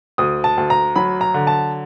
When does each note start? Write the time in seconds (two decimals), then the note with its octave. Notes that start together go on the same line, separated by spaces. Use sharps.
0.18 D2 D#6
0.44 A5
0.57 D2
0.70 A#5
0.96 F#3 B5
1.21 A#5
1.34 D3
1.47 A5